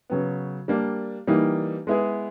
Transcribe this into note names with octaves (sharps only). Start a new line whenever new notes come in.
C#3 F#3 B3
G3 A#3 D4
E3 G3 A#3 D#4
G#3 B3 E4 G#4